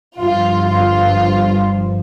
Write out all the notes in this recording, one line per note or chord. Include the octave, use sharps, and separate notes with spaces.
G1 G2 F3 F4
F4